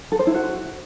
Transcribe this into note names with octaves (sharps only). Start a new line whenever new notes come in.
A4
C5
E4
F#4